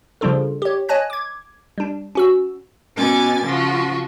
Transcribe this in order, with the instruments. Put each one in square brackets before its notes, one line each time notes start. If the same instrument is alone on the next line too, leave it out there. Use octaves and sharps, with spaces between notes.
[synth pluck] C#3 F3 G3 D4 F4 A4
G4 C#5
C#5 D#5 G#5 A5 F#6 A#6
D6 G#6
G3 D4
C#4 F#4 E6
[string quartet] B2 C#4 G#5 D6 A6
C#3 F3 F4 F#4